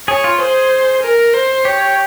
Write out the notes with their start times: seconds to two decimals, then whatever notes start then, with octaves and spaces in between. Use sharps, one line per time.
0.08 G#4 C#5
0.24 F4
0.40 G#4 C5
1.02 A#4
1.34 C5
1.65 G4 C#5